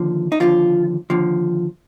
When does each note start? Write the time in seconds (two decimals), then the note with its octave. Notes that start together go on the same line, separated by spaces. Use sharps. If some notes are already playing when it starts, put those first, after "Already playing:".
Already playing: D#2 D3 F3
0.32 D#4
0.40 D#2 D3 F3 F4
1.10 D#2 D3 F3